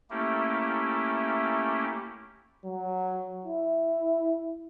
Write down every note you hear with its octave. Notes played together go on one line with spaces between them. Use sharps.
A3 A#3 C#4 E4 G4
F#3
E4